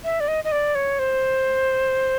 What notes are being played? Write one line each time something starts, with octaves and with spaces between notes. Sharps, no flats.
E5
D5
D#5
D#5
D5
C#5
C5